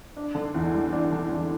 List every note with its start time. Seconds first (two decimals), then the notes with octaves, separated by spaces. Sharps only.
0.17 D4
0.35 D3
0.54 E2
0.74 G3
0.93 D4
1.12 D3
1.32 E2